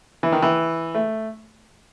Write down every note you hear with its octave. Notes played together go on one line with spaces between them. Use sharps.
E3
D#3
E3
A3